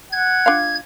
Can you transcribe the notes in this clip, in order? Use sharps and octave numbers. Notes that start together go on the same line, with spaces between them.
F#5 G#6
D4 F4 F5